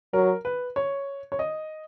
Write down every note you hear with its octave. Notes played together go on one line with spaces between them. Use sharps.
F#3 A#4
B4
C#5
C#5
D#5